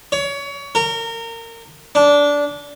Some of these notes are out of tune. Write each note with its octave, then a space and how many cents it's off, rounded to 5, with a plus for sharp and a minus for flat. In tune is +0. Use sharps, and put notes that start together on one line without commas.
C#5 +25
A#4 -25
D4 -15